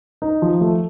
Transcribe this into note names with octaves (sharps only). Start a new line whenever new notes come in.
D#4
F3
A3